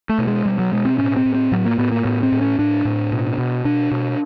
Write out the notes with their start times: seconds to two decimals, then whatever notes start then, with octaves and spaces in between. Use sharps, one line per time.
0.09 A3
0.18 B2
0.27 G#3
0.45 B2 G3
0.59 F#3
0.72 B2 G#3
0.85 C4
0.98 A2 C#4
1.17 C4
1.25 A2
1.34 C4
1.52 A2 F#3
1.65 A#3
1.78 A2 B3
1.92 A#3
2.05 A2 B3
2.23 C4
2.32 A2
2.41 C#4
2.59 A2 D4
2.85 A2
3.12 B2
3.38 B2
3.65 B2 D4
3.91 B2